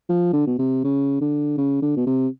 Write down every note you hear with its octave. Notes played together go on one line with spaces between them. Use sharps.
F3
D3
B2
C3
C#3
D3
C#3
D3
B2
C3